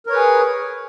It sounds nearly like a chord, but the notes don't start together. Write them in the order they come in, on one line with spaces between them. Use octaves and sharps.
A#4 C#5 B4 G#4